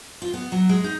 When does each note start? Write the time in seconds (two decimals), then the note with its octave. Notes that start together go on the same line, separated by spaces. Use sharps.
0.22 F4
0.33 B3
0.52 F#3
0.69 G#3
0.84 D#4